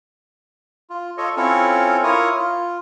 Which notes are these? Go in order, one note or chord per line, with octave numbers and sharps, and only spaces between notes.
F4
F4 A4 C#5 D#5
C4 C#4 E4 F4 A4 C#5
E4 F4 A#4 C#5 D#6
F4